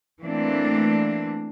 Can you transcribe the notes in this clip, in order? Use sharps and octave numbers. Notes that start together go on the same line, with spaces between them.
E3 A3 A#3 C4 D4